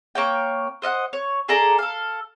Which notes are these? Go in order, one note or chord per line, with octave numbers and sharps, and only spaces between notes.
A#3 C#5 G5
C5 D#5 E5 F#5
C#5
G#4 A4 D5 A#5
A4 F5